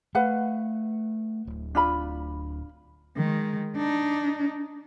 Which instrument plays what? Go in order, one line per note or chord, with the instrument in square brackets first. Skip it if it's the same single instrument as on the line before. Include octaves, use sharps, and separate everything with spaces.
[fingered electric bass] A3 [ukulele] B4 F5 F#5
[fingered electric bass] D1
[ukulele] D4 F4 B5
[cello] D#3 G#3
D4 D#4